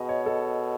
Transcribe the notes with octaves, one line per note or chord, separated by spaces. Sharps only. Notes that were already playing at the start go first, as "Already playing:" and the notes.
Already playing: B2 G#4 D#5
C#5
A4